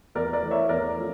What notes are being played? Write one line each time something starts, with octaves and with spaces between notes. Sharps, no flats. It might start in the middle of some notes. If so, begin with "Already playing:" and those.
E2 A#4 D5
A#4 D5
E3 A3
C#5 E5
E2 A#4 D5
F3 A3 C#4